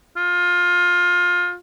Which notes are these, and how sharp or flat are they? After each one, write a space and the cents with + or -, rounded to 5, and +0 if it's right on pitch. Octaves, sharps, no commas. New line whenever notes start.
F4 +20